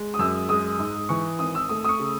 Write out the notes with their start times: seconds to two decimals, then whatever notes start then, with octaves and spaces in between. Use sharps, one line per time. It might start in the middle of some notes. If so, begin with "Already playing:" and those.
Already playing: G#3
0.14 D#6
0.19 F#2 E6
0.49 G#3 D#6
0.79 G#2
1.09 E3 C#6
1.39 G#1 D#6
1.55 E6
1.69 A3 D#6
1.84 D#6
1.89 C#6
1.99 C#3